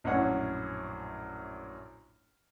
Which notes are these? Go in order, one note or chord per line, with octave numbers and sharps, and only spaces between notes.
A#1 F#2 A2 C#4 C#5 F#5